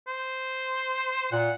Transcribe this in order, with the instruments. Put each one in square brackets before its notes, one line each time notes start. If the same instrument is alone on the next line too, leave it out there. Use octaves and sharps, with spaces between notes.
[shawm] C5
[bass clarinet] A#2 [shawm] F#5